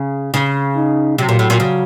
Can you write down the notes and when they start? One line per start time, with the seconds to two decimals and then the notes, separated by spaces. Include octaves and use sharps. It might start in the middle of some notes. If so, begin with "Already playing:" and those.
Already playing: C#3
0.34 C#3
0.76 D#4
1.18 C3 F#3
1.29 A#2
1.39 A2
1.50 A#2
1.60 C#3